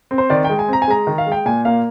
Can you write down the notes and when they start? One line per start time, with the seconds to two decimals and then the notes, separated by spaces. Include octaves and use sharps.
0.11 C4
0.18 C5
0.30 D#3 D5
0.44 G#3 G5
0.59 G#5
0.68 C4 A#5
0.82 G#5
0.88 G#3 A#5
1.07 D#3
1.18 F5
1.26 G#3
1.32 G5
1.46 A#2 G#5
1.65 A#3 F5